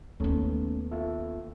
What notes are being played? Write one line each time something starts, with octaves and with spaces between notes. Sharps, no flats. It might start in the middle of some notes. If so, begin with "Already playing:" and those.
D#2 A3 B3 C#4 A4
F4 A4 E5